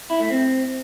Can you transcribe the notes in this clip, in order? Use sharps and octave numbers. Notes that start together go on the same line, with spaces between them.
E4
A3
C4